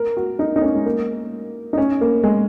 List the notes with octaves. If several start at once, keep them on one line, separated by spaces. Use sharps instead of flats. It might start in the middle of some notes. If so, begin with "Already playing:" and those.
Already playing: A#4
F#4
D#4
D#4
C#4
G#3
A#3
D#4
C#4
A#3
G#3